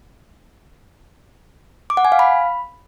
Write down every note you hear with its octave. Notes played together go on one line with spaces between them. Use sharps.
D6
F#5
G#5
F5
B5